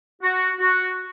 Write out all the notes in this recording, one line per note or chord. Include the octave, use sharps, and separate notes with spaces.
F#4
F#4